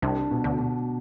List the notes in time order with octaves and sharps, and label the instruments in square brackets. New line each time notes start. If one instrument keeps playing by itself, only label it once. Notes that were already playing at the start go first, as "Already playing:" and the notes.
[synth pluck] C2 C3 [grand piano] D4
[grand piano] B2
[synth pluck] D2 D3
[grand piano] B2